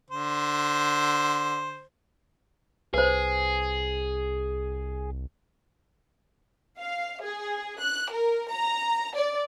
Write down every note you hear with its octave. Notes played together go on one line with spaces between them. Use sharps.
D3 C5
C2 G#4 B4 C5
F5
G#4
F#6
A#4
A#5
D5